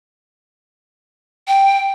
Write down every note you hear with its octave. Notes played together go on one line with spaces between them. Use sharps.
G5